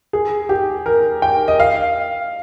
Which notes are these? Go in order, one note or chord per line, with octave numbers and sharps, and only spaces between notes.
G#4
G4
A#4
G5
D#5
F5